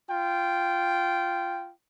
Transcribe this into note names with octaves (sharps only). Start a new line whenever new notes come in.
F4 G5